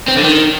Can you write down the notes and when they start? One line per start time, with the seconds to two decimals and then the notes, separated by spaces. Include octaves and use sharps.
0.09 C4
0.17 D3
0.24 D#3